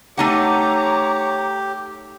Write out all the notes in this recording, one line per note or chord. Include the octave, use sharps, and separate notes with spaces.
A3 D#4 G4 C#5 F#5 A#5 D6